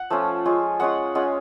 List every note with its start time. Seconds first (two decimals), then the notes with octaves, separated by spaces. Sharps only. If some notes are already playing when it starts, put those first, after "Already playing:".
Already playing: F#5
0.10 F3 A3 C#4 F4
0.45 G#3 C#4 F4
0.80 G#3 C#4 F4 F#5
1.15 G#3 C#4 F4 F#5